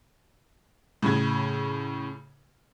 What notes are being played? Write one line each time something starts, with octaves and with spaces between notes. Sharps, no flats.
A2 C#3 G#6